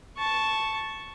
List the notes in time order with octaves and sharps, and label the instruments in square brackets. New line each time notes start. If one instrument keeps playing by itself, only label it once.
[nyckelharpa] A5 C#6